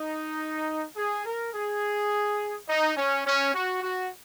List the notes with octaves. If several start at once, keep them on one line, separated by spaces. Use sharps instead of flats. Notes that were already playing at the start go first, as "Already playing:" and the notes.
Already playing: D#4
G#4
A#4
G#4
D#4
C#4
C#4
F#4
F#4